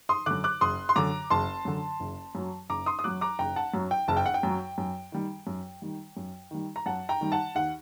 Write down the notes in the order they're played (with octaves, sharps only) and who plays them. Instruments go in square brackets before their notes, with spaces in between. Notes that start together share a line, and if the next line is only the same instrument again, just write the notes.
[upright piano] C6 D#6
F#2 D3 D6 F#6
D6 F#6
F#1 C6 D#6
C6
F#2 D3 A#5 D6
F#1 A5 C6
F#2 D3
F#1
F#2 F#3
F#1 A#5 D6
C6 D#6
D#6
F#2 F#3 D6 F#6
A#5 D6
F#1 G5 A#5
F#5 A5
F#2 F#3
G5
F#1 A5
G5
F#5
G5
F#2 F#3
F#2
D#3 G3
F#2
D#3 G3
F#2
D#3 G3
A#5
F#2 F#5 A5
G5 A#5
D#3 G3
F#5 A5
D#2 F#5